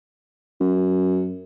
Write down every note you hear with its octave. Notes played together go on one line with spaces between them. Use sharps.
F#2